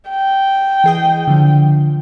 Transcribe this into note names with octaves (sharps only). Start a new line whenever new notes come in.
G5
E3 G#4 D#5
D3 F3